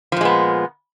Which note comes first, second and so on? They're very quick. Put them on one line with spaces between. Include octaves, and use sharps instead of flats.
F3 A#2 G#3 B3